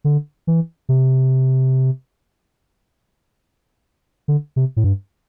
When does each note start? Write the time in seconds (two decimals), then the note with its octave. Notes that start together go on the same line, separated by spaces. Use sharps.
0.04 D3
0.47 E3
0.89 C3
4.28 D3
4.56 C3
4.76 A2
4.84 G2